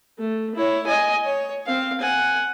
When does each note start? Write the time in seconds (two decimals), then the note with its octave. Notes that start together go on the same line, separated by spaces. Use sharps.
0.18 A3
0.55 E4 C#5
0.87 D#5 G#5
1.24 C#5
1.66 C4 F5
2.01 F#5 G#5